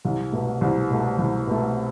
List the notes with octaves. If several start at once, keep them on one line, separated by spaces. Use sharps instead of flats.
C2
B2 A3
C2
B2 A3
C2
B2 A3